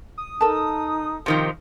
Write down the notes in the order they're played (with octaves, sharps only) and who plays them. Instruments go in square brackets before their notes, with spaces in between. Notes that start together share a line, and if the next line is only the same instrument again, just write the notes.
[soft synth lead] D#6
[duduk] D#4 [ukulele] A4 A#4 A5
[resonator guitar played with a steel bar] C3 D#3 F3